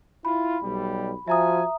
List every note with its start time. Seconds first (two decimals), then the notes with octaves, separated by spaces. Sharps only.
0.25 E4 F4 B5
0.63 B1 G3
1.28 F3 F#4 E5 G#5 A#5 D#6